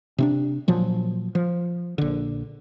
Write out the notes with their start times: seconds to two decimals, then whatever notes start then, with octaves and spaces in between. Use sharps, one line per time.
0.18 C3 C#4 D4
0.68 A#2 F3 F#3
1.35 F3
1.98 A#1 D3